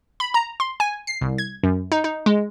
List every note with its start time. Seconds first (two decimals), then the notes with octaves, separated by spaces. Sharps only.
0.20 B5
0.34 A#5
0.60 C6
0.80 G#5
1.07 C7
1.21 C2
1.38 G#6
1.63 F#2
1.92 D#4
2.04 D#4
2.26 G#3